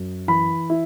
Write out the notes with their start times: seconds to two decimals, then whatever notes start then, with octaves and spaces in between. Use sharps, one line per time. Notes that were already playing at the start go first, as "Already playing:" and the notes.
Already playing: F#2
0.28 E3 B5
0.70 E4